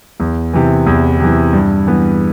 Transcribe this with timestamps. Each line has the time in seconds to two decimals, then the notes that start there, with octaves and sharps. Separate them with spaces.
0.20 E2
0.53 C3 E3
0.87 E2
1.19 C3 E3
1.53 G2
1.87 E3 B3